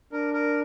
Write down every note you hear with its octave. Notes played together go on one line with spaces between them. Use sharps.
D4 A#4
A#4